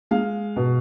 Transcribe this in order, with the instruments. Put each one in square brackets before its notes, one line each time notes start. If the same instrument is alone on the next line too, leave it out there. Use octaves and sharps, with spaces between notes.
[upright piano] G#3 F5
B2